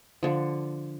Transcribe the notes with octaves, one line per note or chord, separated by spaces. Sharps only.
D3 F3